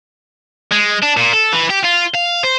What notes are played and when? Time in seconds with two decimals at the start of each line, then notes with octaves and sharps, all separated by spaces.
0.72 G#3
1.03 D4
1.17 A#2
1.34 A4
1.53 E3
1.70 G4
1.85 F4
2.15 F5
2.43 C5